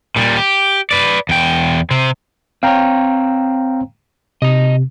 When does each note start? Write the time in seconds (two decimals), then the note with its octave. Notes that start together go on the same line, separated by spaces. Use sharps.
0.16 A#2 G3
0.36 G4
0.91 B4 D5
1.29 E2 G5
1.91 C3 C4
2.63 C4 C#5 F5 G5 A#5
4.42 C3 D#5 A#5